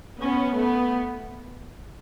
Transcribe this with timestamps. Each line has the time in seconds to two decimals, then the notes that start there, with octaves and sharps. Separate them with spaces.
0.20 B3 C#4
0.55 A3 B3